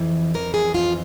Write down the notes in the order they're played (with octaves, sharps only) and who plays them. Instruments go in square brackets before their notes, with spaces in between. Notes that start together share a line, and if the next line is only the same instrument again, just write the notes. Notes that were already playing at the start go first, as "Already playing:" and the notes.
Already playing: [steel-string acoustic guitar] F2 E3
E3 A#4
G#4
F2 F4